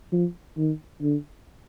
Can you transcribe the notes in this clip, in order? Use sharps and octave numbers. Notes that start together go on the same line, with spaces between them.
F3
D#3
D3